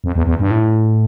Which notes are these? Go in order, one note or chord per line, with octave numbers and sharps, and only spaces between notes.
F2
E2
E2
G2
A2